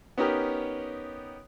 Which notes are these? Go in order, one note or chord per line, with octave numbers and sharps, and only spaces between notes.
B3 C#4 D#4 G4 A#4